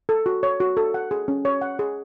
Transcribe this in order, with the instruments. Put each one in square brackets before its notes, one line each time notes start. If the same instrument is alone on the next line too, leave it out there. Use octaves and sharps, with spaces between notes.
[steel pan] A4
F#4
C#5
F#4
A4
F#5
G#4
C#4
C#5
F#5
G#4